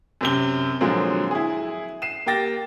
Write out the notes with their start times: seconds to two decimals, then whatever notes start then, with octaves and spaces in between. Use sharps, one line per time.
0.21 F#2 C3 G7
0.81 A#2 D3 F3 F#3 G#3 C4
1.31 E4 G#4
2.02 C7 D#7 E7
2.26 A#3 G4 G5 A6 A#6